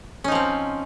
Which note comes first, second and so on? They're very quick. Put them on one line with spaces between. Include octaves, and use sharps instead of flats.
C#4 D#4 F3 C4